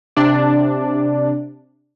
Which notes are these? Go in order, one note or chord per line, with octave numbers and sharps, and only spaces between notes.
C3 D4 D5